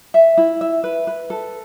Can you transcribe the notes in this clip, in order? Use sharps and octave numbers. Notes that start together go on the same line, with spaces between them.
E5
E4
E5
B4
B4
A4